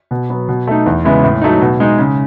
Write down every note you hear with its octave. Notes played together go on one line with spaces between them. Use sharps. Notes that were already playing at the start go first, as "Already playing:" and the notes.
B2
F#3 B3
B2
A3 D#4
E2
C#3 G#3 B3 E4
A2
F#3 A3 D#4
B2
G#3 D#4
C#3